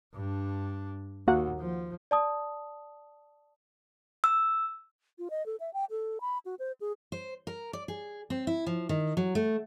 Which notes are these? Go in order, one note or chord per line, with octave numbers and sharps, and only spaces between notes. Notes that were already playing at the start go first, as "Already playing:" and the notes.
G2 D4
D#2 A#3 F#4 F#5
F3
D5 A5 D#6
E6
F4
D#5
A4
E5
G5
A4
B5
F#4
C5
G#4
C5
A#4
D5
G#4
C4
E4
F3
D#3
F#3
A3